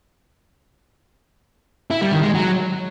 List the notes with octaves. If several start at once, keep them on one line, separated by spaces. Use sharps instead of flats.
E4
G3
D#3
G#3
F#3